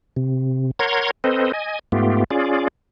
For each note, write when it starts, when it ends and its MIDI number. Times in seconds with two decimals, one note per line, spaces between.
0.16 0.71 48
0.79 1.11 70
0.79 1.11 73
0.79 1.11 78
0.79 1.11 82
0.79 1.11 84
0.79 1.11 92
1.24 1.52 60
1.24 1.52 69
1.24 1.52 71
1.24 1.52 72
1.24 1.52 75
1.53 1.79 75
1.53 1.79 80
1.92 2.24 44
1.92 2.24 57
1.92 2.24 59
1.92 2.24 65
1.92 2.24 67
2.31 2.68 61
2.31 2.68 65
2.31 2.68 68
2.31 2.68 74